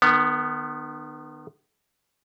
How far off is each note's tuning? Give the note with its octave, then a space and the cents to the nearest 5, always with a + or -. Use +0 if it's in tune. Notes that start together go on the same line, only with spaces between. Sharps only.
D#3 -40 B3 +0